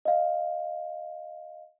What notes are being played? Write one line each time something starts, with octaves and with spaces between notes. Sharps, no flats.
D#5 F5